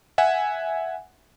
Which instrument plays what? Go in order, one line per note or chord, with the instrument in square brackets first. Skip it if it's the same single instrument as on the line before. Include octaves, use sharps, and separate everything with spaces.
[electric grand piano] E5 F#5 G#5